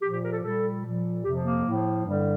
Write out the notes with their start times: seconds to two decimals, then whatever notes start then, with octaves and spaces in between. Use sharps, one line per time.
0.02 A#2 F3 G4
0.13 G4
0.24 A#4
0.33 A4
0.43 A#2 G3 A4
0.84 A#2 F3
1.24 F2 C3 F3 G4
1.44 A#3
1.65 A2 F3
2.05 G2 D3 G3